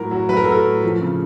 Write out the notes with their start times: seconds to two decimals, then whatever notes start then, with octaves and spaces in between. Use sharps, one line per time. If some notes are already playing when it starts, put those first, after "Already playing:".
Already playing: A2 F#3 A#4
0.11 F#3
0.29 F#3 B4
0.37 A#4
0.44 A4
0.47 F#3 A#4
0.65 A2
0.83 F3
1.02 C#3